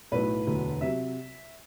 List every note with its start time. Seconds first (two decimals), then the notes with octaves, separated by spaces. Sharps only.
0.12 B1 A2 F#3 B4
0.46 E1 D2 D3 F#3
0.81 C3 F#3 E5